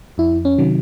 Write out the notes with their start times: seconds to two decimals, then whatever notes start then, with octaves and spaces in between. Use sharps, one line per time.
0.18 F2 E4
0.45 C#4
0.58 C3 D#3 F#3